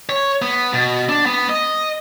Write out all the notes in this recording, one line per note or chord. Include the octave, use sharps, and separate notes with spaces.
C#5
B3
B2
D4
B3
D#5